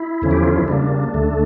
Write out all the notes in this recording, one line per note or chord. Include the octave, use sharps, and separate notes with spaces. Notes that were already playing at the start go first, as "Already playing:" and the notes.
Already playing: E4
E2 D3 F3 C#4
G4
F4
E4
C#3 G3 A#3 D4
D2 D3 A3